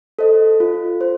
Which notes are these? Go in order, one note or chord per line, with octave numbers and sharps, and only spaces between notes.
A4 C5 D#5
F4
C5